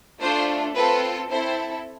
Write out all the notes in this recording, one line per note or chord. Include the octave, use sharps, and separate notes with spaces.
A3 D4 F4 A4 C5
C4 F4 A4 B4
C4 E4 A4 C5